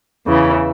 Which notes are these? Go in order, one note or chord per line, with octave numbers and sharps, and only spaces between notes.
E2 C#3 E3